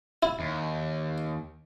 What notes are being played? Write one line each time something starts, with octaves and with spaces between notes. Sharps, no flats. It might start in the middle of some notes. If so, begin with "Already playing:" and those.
E4
D#2